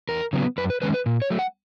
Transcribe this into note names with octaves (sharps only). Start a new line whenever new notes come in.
E2 A#4
C#3 F#3 B3
F#2 B4
B4
D#3 G#3 C#4 B4
B4
A#2
C#5
F#3 A3
F#5